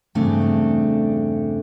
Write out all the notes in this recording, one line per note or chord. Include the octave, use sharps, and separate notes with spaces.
E2 G2 C#3 A3 C4 D4